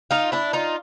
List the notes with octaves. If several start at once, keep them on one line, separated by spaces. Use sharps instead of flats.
D#4 F4
D4 E4
D#4 F4